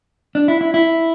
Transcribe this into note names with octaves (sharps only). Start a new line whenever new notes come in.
D4
E4
E4
E4